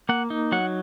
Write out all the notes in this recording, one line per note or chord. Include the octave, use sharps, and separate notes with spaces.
A#3 F#5
D#4
F#3 F#5